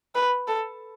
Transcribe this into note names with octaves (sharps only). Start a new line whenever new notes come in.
B4
A4